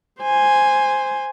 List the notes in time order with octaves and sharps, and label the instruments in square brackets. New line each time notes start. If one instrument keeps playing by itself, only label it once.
[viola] C5 G#5